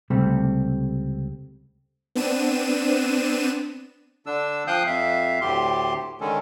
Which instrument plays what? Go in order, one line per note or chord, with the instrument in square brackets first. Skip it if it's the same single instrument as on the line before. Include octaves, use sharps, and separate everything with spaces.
[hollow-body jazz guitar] C#2 C3 G3 A3 C4 A4
[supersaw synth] B3 C4 D4 D#7 E7
[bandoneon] D3 D4 E6
F3 F5 G5 D#6 F#6 G6
F2 E5 F5
D2 A2 G4 C6
D3 D#3 G#3 C#4 A4